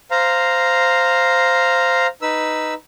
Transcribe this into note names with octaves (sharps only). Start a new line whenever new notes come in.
C5 F5 A#5
D#4 B4 E6